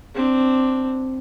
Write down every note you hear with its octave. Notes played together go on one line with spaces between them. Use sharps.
C4 D4